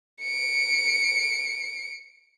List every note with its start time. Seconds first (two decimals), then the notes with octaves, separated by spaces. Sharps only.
0.22 C#7 D7